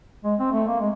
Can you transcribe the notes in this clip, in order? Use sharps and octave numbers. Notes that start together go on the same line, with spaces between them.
G#3
C4
A3
A#3
G#3